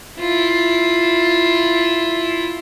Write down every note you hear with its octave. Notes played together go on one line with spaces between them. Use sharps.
E4 F4